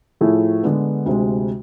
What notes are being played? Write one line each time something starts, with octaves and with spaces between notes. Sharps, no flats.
A2 F3 A3 E4 G#4
D3 G#3 B3
D2 C3 G#3